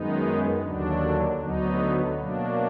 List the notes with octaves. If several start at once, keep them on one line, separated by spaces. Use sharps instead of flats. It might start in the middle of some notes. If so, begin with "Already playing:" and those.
Already playing: F#2 D#3 G#3 B3 D#4
D#2 D3 F#3 D4
D2 D3 F#3 B3 D#4
B2 F#3 A#3 D4